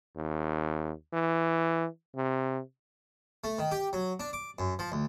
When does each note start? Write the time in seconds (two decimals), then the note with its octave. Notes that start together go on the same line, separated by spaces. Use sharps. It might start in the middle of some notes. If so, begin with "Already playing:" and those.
0.16 D#2
1.13 E3
2.16 C3
3.44 A3
3.59 D#3
3.71 G4
3.93 F#3
4.20 D4
4.33 D6
4.59 F#2
4.79 F3
4.92 D2